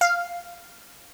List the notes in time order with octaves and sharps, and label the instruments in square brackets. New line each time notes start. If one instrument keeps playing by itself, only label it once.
[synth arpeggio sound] F5